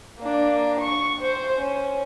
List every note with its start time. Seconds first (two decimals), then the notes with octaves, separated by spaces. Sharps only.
0.19 A#3 D4
0.80 C#6
1.22 C5
1.58 C#4